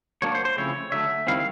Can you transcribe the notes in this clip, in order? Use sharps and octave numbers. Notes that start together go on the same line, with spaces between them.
F#3 A#3 D4 C#5
C5
C5
C#3 F3 A3 C4 E4 C#5
D3 F#3 A3 E5
D#3 G3 C4 E4 F5